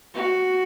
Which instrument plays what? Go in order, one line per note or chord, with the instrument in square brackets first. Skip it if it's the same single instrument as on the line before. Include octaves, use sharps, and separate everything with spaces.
[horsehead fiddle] F#4